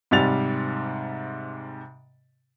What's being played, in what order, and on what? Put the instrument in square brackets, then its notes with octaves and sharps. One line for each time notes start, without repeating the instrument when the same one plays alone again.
[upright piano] G#2 C3 G3 A6 F7